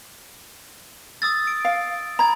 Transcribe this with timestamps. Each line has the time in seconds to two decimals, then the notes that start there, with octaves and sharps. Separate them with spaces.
1.22 D#6 E6 A6
1.47 D7
1.65 F5
2.19 A#5 B5 G#6